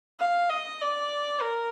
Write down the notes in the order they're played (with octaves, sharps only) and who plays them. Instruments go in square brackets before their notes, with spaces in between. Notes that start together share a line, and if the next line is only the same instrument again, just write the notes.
[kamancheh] F5
D#5
D5
A#4